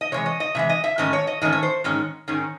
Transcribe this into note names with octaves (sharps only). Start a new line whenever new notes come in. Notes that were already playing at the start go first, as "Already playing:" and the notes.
D#5
C3 E3 G#3 C#5
D#5
D#5
C3 E3 G#3 E5
D#5
E5
G#2 D#3 A3 C#4 D#5
C#5
D#5
G#2 D#3 A3 C#4 D#5
C#5
C5
G#2 D#3 G#3 C#4
G#2 D#3 G#3 C#4